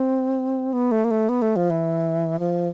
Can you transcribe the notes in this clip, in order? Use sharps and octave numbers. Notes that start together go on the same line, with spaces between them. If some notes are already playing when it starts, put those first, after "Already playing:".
Already playing: C4
B3
A3
A#3
A3
B3
A3
F3
E3
F3